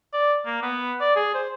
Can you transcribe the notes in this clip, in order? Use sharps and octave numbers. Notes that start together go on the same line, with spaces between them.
D5
A#3
B3
D5
G#4
C5